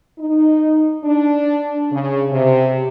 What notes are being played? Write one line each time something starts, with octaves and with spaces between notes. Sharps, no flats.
D#4
D4
C#3
C3